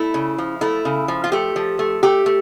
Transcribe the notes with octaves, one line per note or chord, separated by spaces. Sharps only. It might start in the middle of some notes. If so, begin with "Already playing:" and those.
Already playing: A3 E4
C#3
F3
A3 E4
C#3
F3
F4
A3 G4
F3
A3
A3 G4
A3